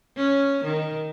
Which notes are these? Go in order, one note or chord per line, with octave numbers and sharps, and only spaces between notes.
C#4
D#3